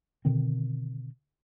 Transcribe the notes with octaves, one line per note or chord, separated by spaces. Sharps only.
B2 D3 D#3 C4